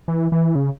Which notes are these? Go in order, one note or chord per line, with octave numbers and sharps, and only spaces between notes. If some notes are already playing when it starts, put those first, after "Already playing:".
E3
E3
C#3